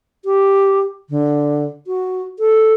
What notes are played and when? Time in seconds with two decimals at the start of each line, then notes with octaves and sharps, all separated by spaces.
0.25 G4
1.10 D3
1.87 F#4
2.39 A4